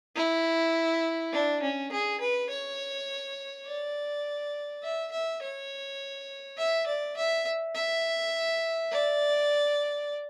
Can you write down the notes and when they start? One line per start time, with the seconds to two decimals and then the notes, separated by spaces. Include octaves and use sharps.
0.16 E4
1.33 D4
1.62 C#4
1.92 G#4
2.21 B4
2.50 C#5
3.66 D5
4.83 E5
5.11 E5
5.41 C#5
6.58 E5
6.87 D5
7.17 E5
7.75 E5
8.91 D5